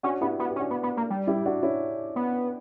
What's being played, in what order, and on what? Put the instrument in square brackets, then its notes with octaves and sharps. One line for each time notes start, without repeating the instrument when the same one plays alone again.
[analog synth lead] C#4 [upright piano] D4 F#4
[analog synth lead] B3 [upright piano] E4 G4
[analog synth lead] B3 [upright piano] F#4
[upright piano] G4
[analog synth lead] C#4
[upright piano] D4 F#4
[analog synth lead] B3
B3
A#3
G3
[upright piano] E4 G4
D4 F#4
C#4 E4
[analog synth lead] B3